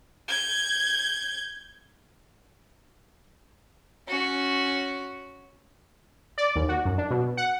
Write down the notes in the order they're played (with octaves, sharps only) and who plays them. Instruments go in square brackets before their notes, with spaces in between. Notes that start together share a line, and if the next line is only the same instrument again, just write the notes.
[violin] G6 G#6
[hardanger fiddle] C#4 F#4
[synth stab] D5
D#2
F#4
F#2
D4
B2
F#5